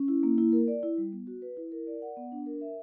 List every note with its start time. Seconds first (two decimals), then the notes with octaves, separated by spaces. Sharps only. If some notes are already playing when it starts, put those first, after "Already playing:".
Already playing: C#4
0.08 E4
0.23 A#3
0.38 E4
0.53 A#4
0.68 D5
0.83 E4
0.98 G3
1.13 B3
1.27 F#4
1.42 B4
1.57 E4
1.72 A#4
1.87 D5
2.02 F#5
2.17 B3
2.32 D4
2.46 A#4
2.61 E5